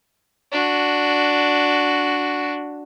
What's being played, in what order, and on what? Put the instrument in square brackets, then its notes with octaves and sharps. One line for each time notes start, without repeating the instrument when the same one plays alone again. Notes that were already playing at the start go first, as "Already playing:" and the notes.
[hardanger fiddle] D4 F#4